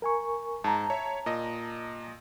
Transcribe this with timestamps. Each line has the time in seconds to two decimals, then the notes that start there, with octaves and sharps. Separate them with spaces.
0.02 A#4 G#5 C#6
0.64 G#2 A5 A#5
0.90 C#5 E5
1.26 A#2 D#5